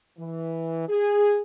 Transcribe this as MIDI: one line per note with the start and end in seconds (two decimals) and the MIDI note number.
0.18 0.86 52
0.88 1.42 68